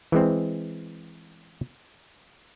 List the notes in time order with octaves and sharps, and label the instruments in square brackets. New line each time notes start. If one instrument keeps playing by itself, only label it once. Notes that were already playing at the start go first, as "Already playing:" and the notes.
[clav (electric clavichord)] E3 G#3 C4